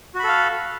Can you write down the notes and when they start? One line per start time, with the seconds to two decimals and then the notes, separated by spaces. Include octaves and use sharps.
0.15 F#4
0.19 B5
0.24 A4
0.28 F5